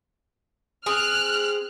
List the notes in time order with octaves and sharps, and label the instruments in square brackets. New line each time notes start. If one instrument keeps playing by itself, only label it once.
[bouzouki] C4 G#4 [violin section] F6 F#6